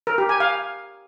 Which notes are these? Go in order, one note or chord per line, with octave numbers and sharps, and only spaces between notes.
A#4
G4
G#5
F5